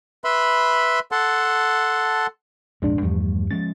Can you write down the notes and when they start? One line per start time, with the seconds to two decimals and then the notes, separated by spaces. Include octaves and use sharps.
0.24 B4 E5 B5 C6
1.12 A4 F#5 A5 C6
2.82 A#1 F2 G#2 G#3 D4
3.02 E2 G2 F3 G3 A3
3.51 F3 G#3 C#4 A6